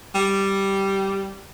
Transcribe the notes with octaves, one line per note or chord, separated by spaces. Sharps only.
G3